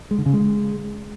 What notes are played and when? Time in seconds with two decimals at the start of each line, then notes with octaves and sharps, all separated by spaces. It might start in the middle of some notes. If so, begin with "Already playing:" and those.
0.11 G#3
0.18 D3
0.26 C#3
0.33 G#3